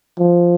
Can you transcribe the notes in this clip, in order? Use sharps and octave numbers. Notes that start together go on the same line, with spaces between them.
F3